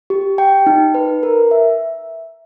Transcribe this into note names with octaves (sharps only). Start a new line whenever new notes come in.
G4
G5
D#4
B4
A#4
E5